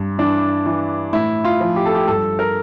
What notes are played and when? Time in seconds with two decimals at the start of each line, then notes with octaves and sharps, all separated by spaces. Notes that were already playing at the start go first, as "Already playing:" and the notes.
Already playing: G2
0.18 E3 D4
0.66 E3
1.13 A2 E4
1.45 F4
1.60 F3
1.76 G4
1.86 A4
1.95 G4
2.08 G2 A4
2.39 A#4